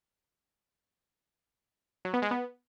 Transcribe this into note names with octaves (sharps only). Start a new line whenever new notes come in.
F#3
B3
G#3
B3